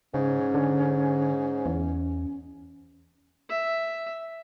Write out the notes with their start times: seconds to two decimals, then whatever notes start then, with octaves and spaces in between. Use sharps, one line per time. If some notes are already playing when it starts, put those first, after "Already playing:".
0.14 G#2 C#3 C#4
0.54 D3
1.66 E2
3.49 E5